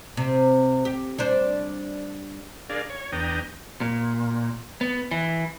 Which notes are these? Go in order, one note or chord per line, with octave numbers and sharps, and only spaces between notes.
C3
G4
G3 D4 C5
D4 G#4 A#4 D5 F5
C#5
E2 B3 D4 G5 A#5 D#6
A#2
B3
E3